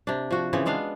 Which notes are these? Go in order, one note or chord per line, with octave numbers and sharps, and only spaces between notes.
C3 D4
F3 F#4
C#3 E3 B3 C4
G#3 B3 D4 F5